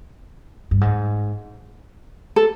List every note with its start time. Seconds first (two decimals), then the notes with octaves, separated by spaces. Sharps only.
0.71 G2
0.81 G#2
2.36 A4